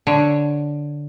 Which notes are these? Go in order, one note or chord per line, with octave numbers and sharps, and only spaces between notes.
D3 C#5